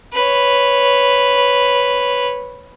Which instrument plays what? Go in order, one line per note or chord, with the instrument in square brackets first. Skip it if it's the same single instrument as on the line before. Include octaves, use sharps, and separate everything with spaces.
[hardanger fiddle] B4 C#5